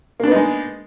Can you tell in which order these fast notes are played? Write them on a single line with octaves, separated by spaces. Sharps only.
A#3 D4 B3 D#4 G#3